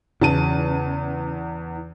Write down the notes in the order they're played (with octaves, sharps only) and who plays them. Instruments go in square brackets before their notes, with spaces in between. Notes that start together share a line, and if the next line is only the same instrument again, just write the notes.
[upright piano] E2 A5 D#7 [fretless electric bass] C#3